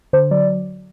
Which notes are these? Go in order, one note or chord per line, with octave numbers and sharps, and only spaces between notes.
D3 C5
F#3 D5